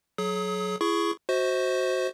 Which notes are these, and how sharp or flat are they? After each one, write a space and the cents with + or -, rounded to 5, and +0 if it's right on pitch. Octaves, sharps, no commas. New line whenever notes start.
F#3 -5 G#4 +40 D#6 +30
E4 +35 G#4 +0 C#6 +0
F#4 +0 C5 +0 D#5 +45